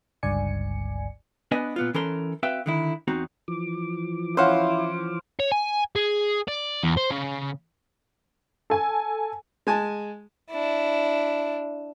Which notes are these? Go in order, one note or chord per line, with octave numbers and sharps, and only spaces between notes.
G1 C#2 G2 D5 G#5 C#7
B3 D4 B4 D#5 G#5
A#2 B3 F4
E3 C#4 A4 A#4 C6
C4 F#4 B4 E5 F5 G5
D3 D#3 E4
E2 C4 D#4 F#4
E3 F3 D6
C#4 E4 C5 F5 F#5
C#5
G#5
G#4
D5
E2
C5
C#3
A4 G#5
G#3 G#5 A5
D4 E4